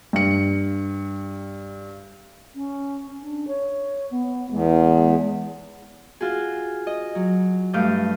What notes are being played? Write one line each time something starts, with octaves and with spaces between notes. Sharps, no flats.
G2 C#7
C#4
D4
C#5
B3
E2 G#3
F4 F#4 G#4
D#5
F#3
G2 A3 F5 D#6 G6